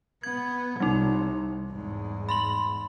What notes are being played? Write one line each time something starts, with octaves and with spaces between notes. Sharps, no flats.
B3 G#6
C2 G3 D#4
E2 G#2
B5 C6 F#7